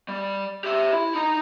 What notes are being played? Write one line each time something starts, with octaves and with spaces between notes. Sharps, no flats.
G3
G4 E5
E4
D#4 A#5